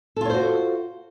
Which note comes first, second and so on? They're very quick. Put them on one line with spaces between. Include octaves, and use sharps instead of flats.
A4 F4 C#5 C5 F#4